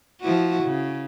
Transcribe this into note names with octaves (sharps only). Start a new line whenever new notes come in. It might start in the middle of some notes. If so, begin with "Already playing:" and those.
F3 E4 F#4
C#3